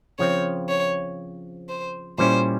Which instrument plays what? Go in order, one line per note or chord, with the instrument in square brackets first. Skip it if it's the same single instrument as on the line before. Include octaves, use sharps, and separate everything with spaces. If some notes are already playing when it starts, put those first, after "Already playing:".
[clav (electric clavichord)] C#3 F3 C4 [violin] C#5
[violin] C#5
C5
[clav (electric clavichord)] A#2 G3 C#4 E4 [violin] C5